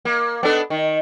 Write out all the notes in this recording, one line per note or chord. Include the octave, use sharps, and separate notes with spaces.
A#3
B3 D4 A4
D#3